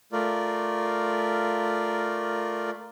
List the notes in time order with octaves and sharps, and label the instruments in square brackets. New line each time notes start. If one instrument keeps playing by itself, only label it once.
[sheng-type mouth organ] A3 F4 A#4 D5